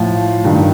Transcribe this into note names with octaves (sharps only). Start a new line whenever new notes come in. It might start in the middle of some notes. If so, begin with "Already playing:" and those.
Already playing: A2 F3
G2 D#3